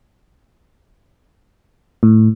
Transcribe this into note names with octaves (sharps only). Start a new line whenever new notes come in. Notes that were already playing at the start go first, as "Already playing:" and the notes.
A2